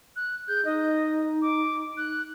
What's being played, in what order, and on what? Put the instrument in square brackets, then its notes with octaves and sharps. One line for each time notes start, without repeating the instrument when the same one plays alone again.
[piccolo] F#6
[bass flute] G#4 [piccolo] G6
[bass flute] D#4 [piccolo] D#5
[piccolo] D6
F#6